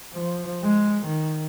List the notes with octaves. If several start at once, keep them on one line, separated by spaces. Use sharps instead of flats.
F3
G#3
D#3